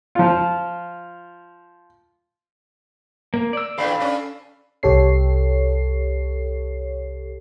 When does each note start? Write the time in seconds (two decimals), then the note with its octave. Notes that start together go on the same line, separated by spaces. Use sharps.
0.15 F3 F4
3.34 A#3
3.53 D5 E6
3.78 E2 A#2 D4 A4 F5 B5
4.00 C#4 D4
4.83 C2 G4 A4 C#5 C7